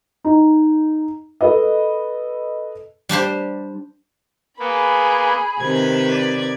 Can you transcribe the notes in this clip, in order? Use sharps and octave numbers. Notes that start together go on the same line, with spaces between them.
D#4
A4 B4 D#5
G3 D4 G4 C5
A#3 B3 G#4 B5
C3 D#3 B4 G#6
D5